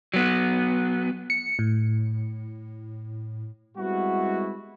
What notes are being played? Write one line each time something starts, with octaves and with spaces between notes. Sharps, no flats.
F#3 B3
C#7
A2
G3 G#3 B3 C4 E4 F#4